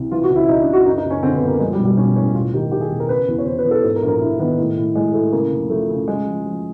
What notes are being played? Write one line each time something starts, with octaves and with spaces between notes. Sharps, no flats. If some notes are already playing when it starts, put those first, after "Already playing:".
Already playing: C2
E3 F4
F#4
C#2
E4
C#2 D#4
D4
C#3
F#4
F#2 D#4
D#4
F#1
C#4
D3 C4
B3
F#2
A#3
F3 G#3
G3
B1
G3
B1 C#4
A2 C#4
E1 F4
D#3 G4
D#3 G4
G#4
E1
A#4
C#3 B4
E2
C#5
E2 C5
B4
E2
A4
G#2 A4
A#4
A#1
A#4
A#1 E4
D#3 B3
A2
A2
A2 G#3
A2 A3
C#3 A#3
F1
F3 A3
C#3
C#3 G#3
F3
F3